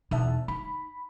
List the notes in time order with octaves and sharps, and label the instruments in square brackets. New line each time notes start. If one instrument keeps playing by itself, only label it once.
[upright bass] E2 D#4 [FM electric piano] B2 E5 A5
[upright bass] D#4 [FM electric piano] B5